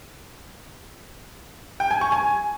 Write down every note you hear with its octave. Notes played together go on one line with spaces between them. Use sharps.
G5
G#5
C#6
G#5